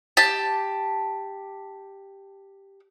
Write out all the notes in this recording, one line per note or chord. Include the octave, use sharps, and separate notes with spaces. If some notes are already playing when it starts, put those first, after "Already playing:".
G4 A5